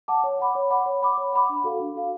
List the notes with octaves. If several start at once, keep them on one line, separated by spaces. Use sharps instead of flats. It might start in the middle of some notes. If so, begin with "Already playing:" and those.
F#5 A5 D6
C#5
F#5 B5 D6
C#5
F#5 B5 D6
C#5
F#5 B5 D6
C#5
F#5 B5 D6
D4
F#4 A4 F5
D4
F#4 A4 F5